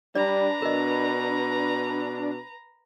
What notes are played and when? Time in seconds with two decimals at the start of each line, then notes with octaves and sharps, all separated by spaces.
0.15 G3 D4 B4 D5 A#5
0.62 B2 A#4 D#5